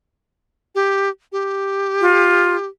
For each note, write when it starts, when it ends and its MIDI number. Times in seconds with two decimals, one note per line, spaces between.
0.75 1.09 67
1.32 2.67 67
2.01 2.56 65